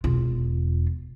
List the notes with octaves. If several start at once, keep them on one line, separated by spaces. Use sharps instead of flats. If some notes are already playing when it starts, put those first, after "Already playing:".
E1 F4